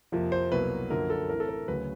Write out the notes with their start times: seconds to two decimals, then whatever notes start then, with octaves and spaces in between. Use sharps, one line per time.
0.12 F2 C3 F3 A#3
0.32 C5
0.51 C2 B2 F#3 A#3 B4
0.90 F#2 D3 F3 A#3 A#4
1.10 A4
1.29 A2 E3 A3 C4 A#4
1.40 A4
1.49 A#4
1.68 D2 C#3 F#3 B4